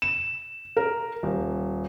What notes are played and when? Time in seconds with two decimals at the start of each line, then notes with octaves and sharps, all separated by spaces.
0.02 E7
0.77 A#4
1.23 D#1